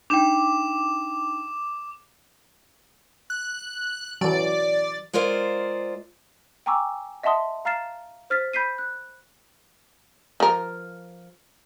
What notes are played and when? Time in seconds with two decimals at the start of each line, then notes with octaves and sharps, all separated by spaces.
0.10 D4 D#4 G5 D6 E7
3.30 F#6
4.21 E3 F#3 D5
5.13 G#3 F4 A#4 C5 D5 F5
6.66 G5 G#5 A#5 C#6 D6 E6
7.23 D#5 E5 F#5 A5 C6 D#6
7.65 F5 A#5 F6 A6 C7 E7
8.30 C5 F6 A6 B6
8.53 B5 G6 B6 C7 D#7
8.78 F#6
10.40 F3 A#4